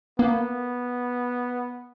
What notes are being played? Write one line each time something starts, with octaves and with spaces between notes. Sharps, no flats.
A#3 B3